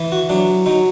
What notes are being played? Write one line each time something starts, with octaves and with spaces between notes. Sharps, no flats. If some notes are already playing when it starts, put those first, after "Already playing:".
Already playing: E3
F#4
F#3 D4
F#3 D#4